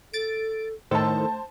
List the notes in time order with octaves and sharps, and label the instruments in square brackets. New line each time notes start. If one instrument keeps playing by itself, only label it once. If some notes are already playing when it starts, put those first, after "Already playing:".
[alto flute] A4 [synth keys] A6 D7
[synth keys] A2 D#3 A4 [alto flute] A3 [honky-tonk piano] C5 A5